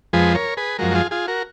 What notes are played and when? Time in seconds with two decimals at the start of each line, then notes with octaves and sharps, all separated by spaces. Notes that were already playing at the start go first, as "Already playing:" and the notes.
0.13 F2 F3 G#3 G#4 B4
0.34 A#4 C#5
0.57 G#4 B4
0.78 F#2 F3 G#3 F#4 A#4
0.91 F#4
0.95 F4 G#4
1.11 F4 G#4
1.28 F#4 A#4